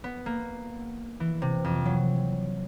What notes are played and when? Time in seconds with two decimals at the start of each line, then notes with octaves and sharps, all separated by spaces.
0.04 B3
0.26 A#3
1.20 E3
1.42 C3
1.64 F2
1.85 F#3